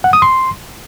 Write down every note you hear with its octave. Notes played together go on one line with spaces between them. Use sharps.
F#5
D#6
C6